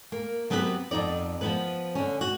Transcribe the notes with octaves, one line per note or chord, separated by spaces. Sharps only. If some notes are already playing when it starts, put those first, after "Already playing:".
A#3
F#3 B3 C4 G4 A4 B4
F2 B3 D#4 D5
F3 B3 B4
D3 C#4
F#4